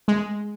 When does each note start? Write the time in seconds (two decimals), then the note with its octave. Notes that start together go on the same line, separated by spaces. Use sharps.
0.08 G#3